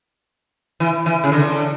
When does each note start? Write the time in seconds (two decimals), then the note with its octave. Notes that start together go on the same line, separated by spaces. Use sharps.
0.80 E3
1.06 E3
1.24 C#3
1.32 D3